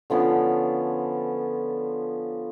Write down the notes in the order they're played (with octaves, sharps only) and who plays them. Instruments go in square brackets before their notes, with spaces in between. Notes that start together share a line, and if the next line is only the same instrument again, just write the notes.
[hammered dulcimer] D3 F3 B3 C#4